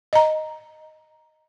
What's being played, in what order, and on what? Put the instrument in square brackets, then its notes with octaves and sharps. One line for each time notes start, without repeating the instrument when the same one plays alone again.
[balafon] D#5 A#5